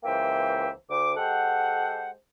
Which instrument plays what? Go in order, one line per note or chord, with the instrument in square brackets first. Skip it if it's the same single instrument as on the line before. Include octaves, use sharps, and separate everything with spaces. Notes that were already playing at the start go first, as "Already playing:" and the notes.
[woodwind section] C#2 E3 A#3 C5 E5 G5
D2 D6
G#3 G4 A4 C5 F#5